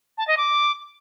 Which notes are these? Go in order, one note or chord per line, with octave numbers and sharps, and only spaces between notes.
A5
D#5
D6